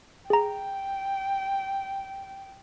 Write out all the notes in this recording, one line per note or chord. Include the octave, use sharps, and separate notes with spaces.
G#4 G5 A#5